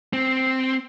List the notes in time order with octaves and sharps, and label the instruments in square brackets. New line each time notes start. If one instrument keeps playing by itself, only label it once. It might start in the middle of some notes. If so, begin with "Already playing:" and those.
[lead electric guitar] C4